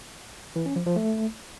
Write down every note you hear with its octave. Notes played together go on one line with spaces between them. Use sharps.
E3
C#4
F3
F3
A3